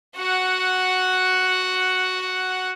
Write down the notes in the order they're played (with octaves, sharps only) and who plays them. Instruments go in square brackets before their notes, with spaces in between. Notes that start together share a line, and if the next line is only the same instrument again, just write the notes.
[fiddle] F#4 F#5